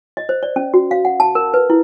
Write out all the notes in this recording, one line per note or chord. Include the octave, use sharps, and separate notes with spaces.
D#5
C5
D5
C#4
F#4
F5
F#5
A5
A#4
B4
E4